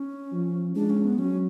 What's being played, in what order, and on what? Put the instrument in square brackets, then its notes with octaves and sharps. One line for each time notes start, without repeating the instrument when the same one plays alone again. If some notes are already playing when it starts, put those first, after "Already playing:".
Already playing: [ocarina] C#4
[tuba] F3
[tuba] G#3 [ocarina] D4
[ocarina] C#4
B3
[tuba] F#3 [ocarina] C#4